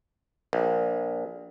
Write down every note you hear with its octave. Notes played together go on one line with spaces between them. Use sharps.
A#1